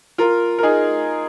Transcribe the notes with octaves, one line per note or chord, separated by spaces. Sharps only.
F4 A#4
A#4
D#4 G#4